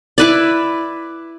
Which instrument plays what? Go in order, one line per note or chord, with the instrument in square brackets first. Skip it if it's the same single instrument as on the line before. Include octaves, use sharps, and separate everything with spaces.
[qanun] E4 B4 D5